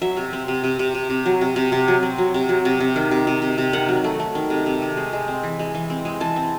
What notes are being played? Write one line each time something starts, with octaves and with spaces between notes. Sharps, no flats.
F#3 E5
C3
C4
C3
C3
C3
C3
C3
F#3
C3
C3
C3
F#3
C4
F#3
C3
F#3
C3
C3
D#3
C3
C3
C3
C3
D#3 F#5
F#3
A3
A3
D#3
C3
C3
A3
G#3
G#3
C4
E3
G#3
E3
C4
G#3
E3 A5
C4